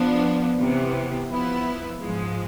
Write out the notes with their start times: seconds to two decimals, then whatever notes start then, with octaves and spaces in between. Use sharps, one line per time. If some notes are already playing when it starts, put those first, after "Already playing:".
Already playing: F3 B3 D4
0.59 C3 E3 B3
1.29 F3 B3 E4
1.99 G#2 F3 G#3